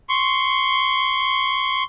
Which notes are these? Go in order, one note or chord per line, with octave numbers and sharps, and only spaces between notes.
C6 C#6